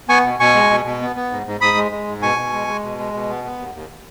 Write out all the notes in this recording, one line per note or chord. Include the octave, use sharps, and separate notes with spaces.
B3 G#5 C#6
B2
B2 G#5 C#6
G#3
B2
B2
B3
B3
G#2
G#2
G#2 B5 D#6
G#3
G#3
G#2
B2 G#5 C#6
B2
G#3
G#3
B2
G#3
B2
B3
B3
D#2
D#2